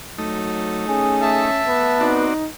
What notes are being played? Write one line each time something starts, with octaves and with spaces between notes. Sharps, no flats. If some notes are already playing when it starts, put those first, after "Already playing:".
F#3 A3 D#4
C#4 G#4
E5 A5
B3
C4 D#4 F#4 D5